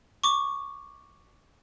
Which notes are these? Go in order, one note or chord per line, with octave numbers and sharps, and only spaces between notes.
C#6 D6